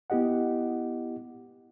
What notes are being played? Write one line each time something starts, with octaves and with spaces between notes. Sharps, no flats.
B3 E4 G4 D#5 F#5